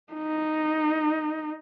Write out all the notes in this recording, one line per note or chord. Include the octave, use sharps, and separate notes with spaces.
D#4